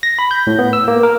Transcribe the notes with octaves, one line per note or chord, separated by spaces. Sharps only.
A#6
B5
G6
A2
B3
E6
A#3
A#4